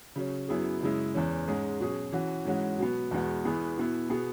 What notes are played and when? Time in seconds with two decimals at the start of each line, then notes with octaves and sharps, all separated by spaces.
0.16 C#3 F#3 C#4
0.48 F#2 F#3 B3 E4 G#4
0.81 F#2 C#3 G#3 E4
1.14 E2 E3 C#4
1.47 G#2 G#3 C#4 G#4
1.80 B2 F#3 C#4 G#4
2.12 E3 C#4 F#4
2.45 G#2 E3 G#3 C#4 F#4
2.79 B2 F#3 B3
3.11 E2 B2 G#3 B3 F#4
3.45 E2 E3 B3 E4 G#4
3.77 B2 B3 E4
4.10 B2 B3 G#4